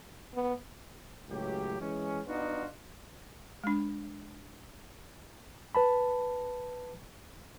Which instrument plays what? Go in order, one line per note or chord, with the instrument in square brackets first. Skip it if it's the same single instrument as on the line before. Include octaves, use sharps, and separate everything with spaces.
[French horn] B3
[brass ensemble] C#2 A2 F#3 G4
E3 G#3 C#4
B3 D4 D#4 F4 F#4
[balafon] G#3 D4
[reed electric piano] B4 A5 B5